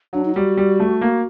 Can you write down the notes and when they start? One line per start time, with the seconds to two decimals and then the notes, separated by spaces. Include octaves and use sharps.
0.13 F#3 D4
0.25 D#4
0.35 G3 F#4
0.57 G3
0.80 A3
1.01 A#3